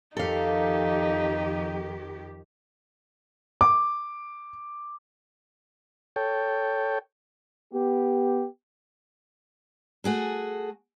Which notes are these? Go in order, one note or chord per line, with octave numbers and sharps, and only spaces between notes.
F2 D#3 D#4 G4 A4 F5
D6
A4 C#5 G5
B3 G4
A3 F#4 G#4 A4